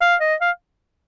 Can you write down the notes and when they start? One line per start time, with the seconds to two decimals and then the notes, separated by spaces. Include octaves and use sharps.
0.02 F5
0.21 D#5
0.41 F5